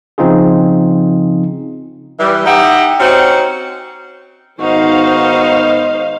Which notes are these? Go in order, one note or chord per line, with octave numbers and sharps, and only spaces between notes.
C#3 F3 C4 D#4 F4 G#4
E3 G3
D#4 G4 E5 F#5
C4 C#4 D#4 F#4 C5
G#2 D#3 B3 D#4 F#4 C5 F5